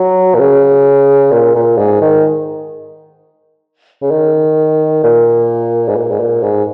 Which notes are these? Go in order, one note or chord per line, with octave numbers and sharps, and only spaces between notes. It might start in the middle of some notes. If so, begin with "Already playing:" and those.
Already playing: F#3
A#2
C#3
A#2
A#2
G#2
D#3
C#3
D#3
A#2
G#2
A#2
G#2
A#2
G#2